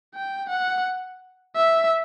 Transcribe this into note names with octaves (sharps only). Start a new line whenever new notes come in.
G5
F#5
E5